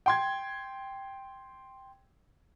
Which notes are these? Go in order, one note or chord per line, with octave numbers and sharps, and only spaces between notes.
G5 C6 G#6